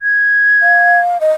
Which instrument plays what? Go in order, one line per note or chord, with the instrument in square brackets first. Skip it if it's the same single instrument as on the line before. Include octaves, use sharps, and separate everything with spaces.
[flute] G#6
[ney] F5
D#5